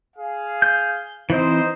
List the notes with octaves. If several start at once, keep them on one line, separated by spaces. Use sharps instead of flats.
G#4 F5
G6
E3 C4 D#4 C5 D#5